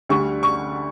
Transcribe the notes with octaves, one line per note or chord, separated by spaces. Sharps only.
D2 D3 G3 C#6
C#6